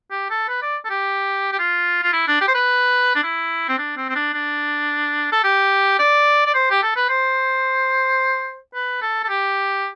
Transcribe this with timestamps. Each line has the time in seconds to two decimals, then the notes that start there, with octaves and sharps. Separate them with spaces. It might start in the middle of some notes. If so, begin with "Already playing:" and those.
0.11 G4
0.30 A4
0.49 B4
0.62 D5
0.85 A4
0.90 G4
1.52 G4
1.59 F4
2.03 F4
2.13 E4
2.28 D4
2.41 G4
2.48 C5
2.55 B4
3.15 D4
3.23 E4
3.69 C4
3.78 D4
3.97 C4
4.09 C4
4.15 D4
4.34 D4
5.32 A4
5.44 G4
5.99 D5
6.46 D5
6.54 C5
6.70 G4
6.83 A4
6.96 B4
7.09 C5
8.74 B4
9.02 A4
9.24 A4
9.29 G4